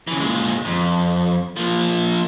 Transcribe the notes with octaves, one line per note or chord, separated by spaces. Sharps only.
C#3 E3
A#2 G#3
F2
F3 A#3